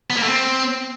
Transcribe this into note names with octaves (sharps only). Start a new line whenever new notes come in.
B3
A#3
A3
C4